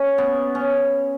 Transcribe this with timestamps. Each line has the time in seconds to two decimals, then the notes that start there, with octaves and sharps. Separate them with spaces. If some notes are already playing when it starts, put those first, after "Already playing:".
Already playing: C#4
0.18 B3
0.55 C#4